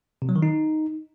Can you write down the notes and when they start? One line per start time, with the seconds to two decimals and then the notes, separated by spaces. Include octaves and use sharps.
0.22 C3
0.29 F#3
0.36 D#3
0.43 D#4